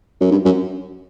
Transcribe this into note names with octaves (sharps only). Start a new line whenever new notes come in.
F#2
G2
F#2